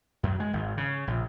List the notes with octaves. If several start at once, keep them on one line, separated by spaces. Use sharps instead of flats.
F#2
G#3
G#1
C#3
A#1